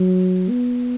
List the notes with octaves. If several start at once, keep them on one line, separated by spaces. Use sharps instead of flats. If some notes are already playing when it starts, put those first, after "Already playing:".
Already playing: F#3
B3